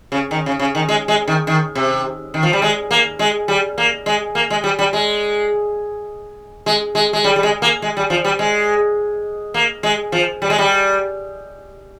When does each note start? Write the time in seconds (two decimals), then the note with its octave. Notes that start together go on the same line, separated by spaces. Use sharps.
0.12 C#3
0.31 D#3
0.46 C#3
0.60 C#3
0.75 D#3
0.89 G#3
1.08 G#3
1.28 D#3
1.47 D#3
1.75 C3
2.34 D#3
2.43 F3
2.53 G3
2.62 G#3
2.91 A#3
3.19 G#3
3.48 G3
3.78 A#3
4.06 G#3
4.35 A#3
4.50 G#3
4.64 G3
4.79 G3
4.93 G#3
6.66 G#3
6.95 G#3
7.13 G#3
7.24 G3
7.36 G3
7.43 G#3
7.62 A#3
7.82 G#3
7.97 G3
8.10 F3
8.24 G3
8.39 G#3
9.54 A#3
9.83 G#3
10.12 F3
10.42 G3
10.50 G#3
10.58 G3